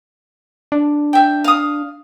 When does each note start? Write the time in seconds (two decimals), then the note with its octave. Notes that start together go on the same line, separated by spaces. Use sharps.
0.72 D4
1.13 E5 G5
1.44 F5 D#6